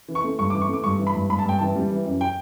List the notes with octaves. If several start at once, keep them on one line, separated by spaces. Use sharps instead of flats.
E3
C#6
A3
G2 C#6
D6
E3
C#6
A3 D6
G2 C#6
E3
B5
G2
G2 B5
A5
G2 G5
E3 A5
G3
E3
F#2
G5